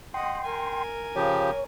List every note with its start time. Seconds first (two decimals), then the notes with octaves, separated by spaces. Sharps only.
0.14 D#5 F#5 G5 C6
0.45 A#4 G#5
1.16 C#3 F3 G4 C#5